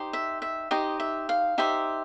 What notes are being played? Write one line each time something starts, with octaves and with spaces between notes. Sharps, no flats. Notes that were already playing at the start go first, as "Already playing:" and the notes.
Already playing: D#4 G4 C5
E5
E5
D#4 G4 C5 D#5
E5
F5
D#4 G4 C5 E5